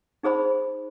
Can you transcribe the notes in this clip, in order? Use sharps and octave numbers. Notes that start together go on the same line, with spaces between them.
D#4 G#4 C5 B5